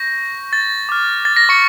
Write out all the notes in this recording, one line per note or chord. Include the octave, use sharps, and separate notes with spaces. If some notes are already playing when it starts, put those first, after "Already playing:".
Already playing: C#6 G6 A#6
A6
D6 F6
A6
A#6
C#6 C#7